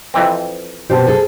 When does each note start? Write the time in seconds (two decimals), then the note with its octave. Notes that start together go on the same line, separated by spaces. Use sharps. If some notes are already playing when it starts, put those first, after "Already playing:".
0.14 F2 E3 C4
0.90 B2 G4 C5 A5
1.07 G#4 A4